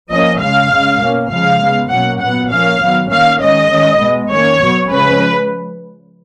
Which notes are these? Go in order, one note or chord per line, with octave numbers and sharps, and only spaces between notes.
F3 A#3 C#4 D#5
C#3 G#3 C#4 F5
C#3 G#3 C#4
B2 A#3 C#4
C#3 F3 G#3 F5
C#3 G#3 B3
B2 F#3 A#3 C#4 F#5
A#2 F#3 B3 F#5
F3 A#3 C#4 F5
D#3 F#3 B3
D#3 A#3 C#4 F5
D#3 G#3 C#4 D#5
D#3 G#3 C#4
B2 G#3 B3
D#3 A#3 C#4 C#5
B2 F#3 B3
C#3 F3 G#3 C#4 B4